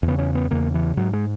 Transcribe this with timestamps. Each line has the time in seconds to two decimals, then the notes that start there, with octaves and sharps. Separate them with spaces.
0.03 E2
0.08 C#3 B3
0.18 C#4
0.35 B3
0.51 E2 C#3 A#3
0.74 E3
0.97 G#2 F#3
1.13 G#3